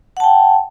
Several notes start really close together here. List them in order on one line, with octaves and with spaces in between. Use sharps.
F#5 A5 G5